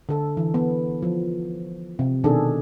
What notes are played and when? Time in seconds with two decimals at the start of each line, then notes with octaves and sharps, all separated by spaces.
0.09 D3 A4
0.37 E3
0.54 B3
1.02 F3
1.99 C3
2.24 B2 D#3 D4 G#4 A4